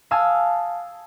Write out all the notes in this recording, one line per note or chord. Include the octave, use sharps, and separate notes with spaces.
F5 G#5 A5 D#6 E6